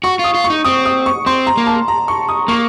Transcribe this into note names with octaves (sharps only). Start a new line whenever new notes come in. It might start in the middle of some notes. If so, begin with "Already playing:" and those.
F#4 C#6
F4
D#6
F4
C#6
D#4
C4 D#6
D#6
C#6
C4 C6
A#5
A#3
A5
A#5
C#6
D#6
A#3 C#6